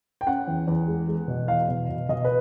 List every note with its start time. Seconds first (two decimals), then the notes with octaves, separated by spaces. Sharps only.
0.21 G5
0.27 C#4 F#5
0.47 E2
0.67 E2
0.88 G#3
1.08 G#3
1.28 B2
1.48 E2 F5
1.69 B2
1.89 B2
2.09 B2 D#5
2.25 B4